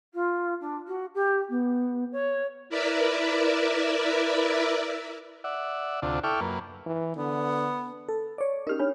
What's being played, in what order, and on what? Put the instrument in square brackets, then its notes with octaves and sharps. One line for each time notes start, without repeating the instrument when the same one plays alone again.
[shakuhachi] F4
D4
F#4
G4
B3
C#5
[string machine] E4 A#4 B4 D5 E5
[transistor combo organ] D5 E5 F#5
D2 C3 D4 F4
E4 A4 G5 C#6 D6 F6
F#2 A#3 B4
[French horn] E3
[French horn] D3 [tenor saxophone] B3
[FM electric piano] A4
C#5 D5
[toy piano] C#4 G4 A#4 [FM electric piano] D#4 F6
[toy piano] D4 C#5 B5